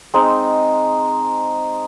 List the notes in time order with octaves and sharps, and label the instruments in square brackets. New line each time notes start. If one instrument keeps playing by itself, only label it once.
[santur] G#3 C4 D#4